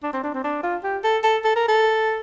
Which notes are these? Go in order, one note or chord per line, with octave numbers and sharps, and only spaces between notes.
D4
C4
D4
C4
D4
F4
G4
A4
A4
A4
A#4
A4